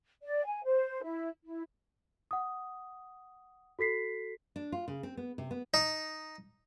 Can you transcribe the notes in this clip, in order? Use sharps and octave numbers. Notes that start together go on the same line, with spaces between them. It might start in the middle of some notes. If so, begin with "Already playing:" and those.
D5
G#5
C5
E4
E4
F#5 D#6
F#4 A4 B6 C7
D4
F4
C#3
C4
B3
C3
B3
D#4